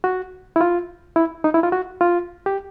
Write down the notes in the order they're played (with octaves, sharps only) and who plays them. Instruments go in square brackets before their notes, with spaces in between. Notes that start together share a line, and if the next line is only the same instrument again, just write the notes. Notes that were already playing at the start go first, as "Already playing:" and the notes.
[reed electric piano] F#4
E4
F4
E4
D#4
E4
F4
F#4
F4
G4